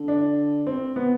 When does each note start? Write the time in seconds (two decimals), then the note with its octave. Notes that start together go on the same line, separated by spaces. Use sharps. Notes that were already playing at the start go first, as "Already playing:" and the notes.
Already playing: D3
0.08 D4
0.67 C4
0.96 B3